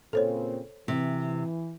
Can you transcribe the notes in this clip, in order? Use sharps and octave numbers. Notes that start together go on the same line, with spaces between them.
A#2 C#3 C4 A4 C5 C#5
C3 E3